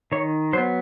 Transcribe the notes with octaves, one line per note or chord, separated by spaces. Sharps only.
D#3 C#5
F#3 B3 C5